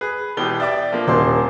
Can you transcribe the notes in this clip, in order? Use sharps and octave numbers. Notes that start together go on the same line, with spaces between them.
G#4 B4
E1 B2 E4 G4 G7
D5 E5 D6
F3 A#3 D4
D#1 C5 C6